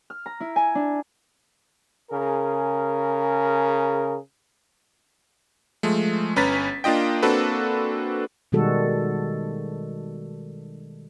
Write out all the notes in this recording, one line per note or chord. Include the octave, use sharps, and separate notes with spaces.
F6
A#5
E4
G#5
D4
C#3 G#4 A#4
F3 G#3 A3
G1 C#4 B4 A#5 A6 B6
A#3 D4 F4 D#5 G5
A#3 C4 D4 F#4 A4 B4
B2 D#3 G3 G#3 F#4 A4